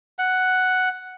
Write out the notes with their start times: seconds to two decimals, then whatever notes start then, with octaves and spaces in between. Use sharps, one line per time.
0.19 F#5